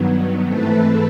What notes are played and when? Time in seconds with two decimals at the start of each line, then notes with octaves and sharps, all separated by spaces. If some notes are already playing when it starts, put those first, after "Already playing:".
Already playing: G2 D#3 F#3 B3
0.47 G#2 E3 A3 C4 A4 B4